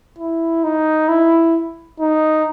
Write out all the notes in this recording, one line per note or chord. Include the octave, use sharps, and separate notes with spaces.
E4
D#4
E4
D#4